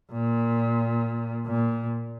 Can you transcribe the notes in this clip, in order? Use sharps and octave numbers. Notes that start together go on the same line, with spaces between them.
A#2
A#2